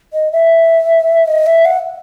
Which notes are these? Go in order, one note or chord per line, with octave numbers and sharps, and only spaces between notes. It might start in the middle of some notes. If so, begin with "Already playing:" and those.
D#5
E5
D#5
E5
F#5